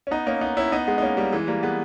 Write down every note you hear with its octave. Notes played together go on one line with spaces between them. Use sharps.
C#4
B3 D#4
A#3 C#4
B3 D#4
C#4 E4
B3 D#4
G#3 B3
D#4
A#3 C#4
G3 A#3
E3 G#3
G3 A#3
G#3 B3